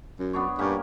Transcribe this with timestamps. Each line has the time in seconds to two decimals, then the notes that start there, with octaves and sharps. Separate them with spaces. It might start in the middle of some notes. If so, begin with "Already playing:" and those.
0.19 F#2
0.33 B3 D4 C#5
0.59 G2 A#3 C#4 G4